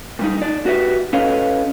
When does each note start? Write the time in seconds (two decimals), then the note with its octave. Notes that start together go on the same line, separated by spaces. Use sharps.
0.19 A#2 G3 D#4
0.37 D#4 D5
0.66 F#4 G4 B4 E5
1.13 C#4 A4 B4 C#5 D#5 F5